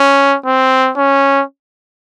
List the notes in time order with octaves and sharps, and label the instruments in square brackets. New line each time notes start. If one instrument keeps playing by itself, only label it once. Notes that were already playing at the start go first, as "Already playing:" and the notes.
Already playing: [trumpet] C#4
C4
C#4